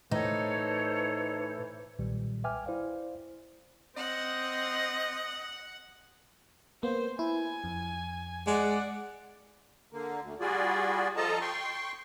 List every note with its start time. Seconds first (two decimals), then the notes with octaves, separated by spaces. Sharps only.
0.11 A2 E3 D#4 A4 C5 C#5
1.99 B1 A#2 D#3 G3
2.44 B4 E5 G5 G#5 D6 F6
2.66 E4 C5 D5 F5
3.97 C4 D#5 F#5
6.83 A#3 B3 C5
7.19 E4 G#5
7.64 F2
8.47 G#3 D5 F#5
9.92 D3 A#3
10.21 D2
10.40 G3 F4 F#4 G#4 D5
11.16 F3 F4 A4 D#5 A5 A#5
11.41 G5 C6 C#6